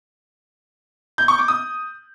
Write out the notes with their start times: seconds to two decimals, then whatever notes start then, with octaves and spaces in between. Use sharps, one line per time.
1.18 G6
1.28 C#6
1.38 D6
1.48 D#6